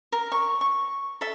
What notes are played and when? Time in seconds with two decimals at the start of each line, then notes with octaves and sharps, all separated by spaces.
0.12 A#4
0.32 C#6
0.61 C#6
1.21 A4 E5